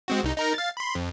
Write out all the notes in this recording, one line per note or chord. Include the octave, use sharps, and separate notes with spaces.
G#3 C4 F#4
C2 D#4
D#4 A#4 A#5
F5 A6
B5 C6
F2